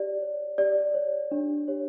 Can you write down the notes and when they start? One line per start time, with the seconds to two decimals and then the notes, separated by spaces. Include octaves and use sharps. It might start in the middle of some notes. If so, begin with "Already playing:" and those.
Already playing: G4 D5
0.21 C#5
0.58 G4 D5
0.94 C#5
1.31 D4
1.68 G4 C#5